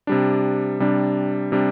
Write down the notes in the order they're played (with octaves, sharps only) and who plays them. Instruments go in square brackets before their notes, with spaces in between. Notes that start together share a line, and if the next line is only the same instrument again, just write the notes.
[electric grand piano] C3 G3 D4
C3 G3 D4
C3 G3 D4